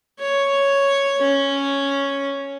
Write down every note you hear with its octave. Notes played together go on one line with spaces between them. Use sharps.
C#5
C#4